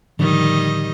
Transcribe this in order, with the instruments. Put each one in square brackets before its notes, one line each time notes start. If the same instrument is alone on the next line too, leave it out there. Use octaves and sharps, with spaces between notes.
[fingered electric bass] A2 D3 F3 [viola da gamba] D#3 G3 D#5